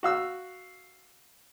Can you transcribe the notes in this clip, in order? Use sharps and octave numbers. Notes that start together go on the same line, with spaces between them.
F#4 F5 E6